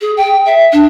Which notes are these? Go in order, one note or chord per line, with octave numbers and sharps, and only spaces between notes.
G#4
G5
E5
D4